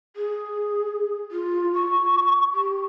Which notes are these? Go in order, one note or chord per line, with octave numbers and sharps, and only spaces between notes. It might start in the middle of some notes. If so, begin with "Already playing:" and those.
G#4
F4
C#6
G4